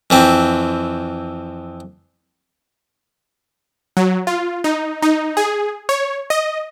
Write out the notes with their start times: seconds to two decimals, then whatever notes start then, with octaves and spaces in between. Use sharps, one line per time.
0.10 F2 E3 C4
3.97 F#3
4.27 F4
4.64 D#4
5.02 D#4
5.37 G#4
5.89 C#5
6.30 D#5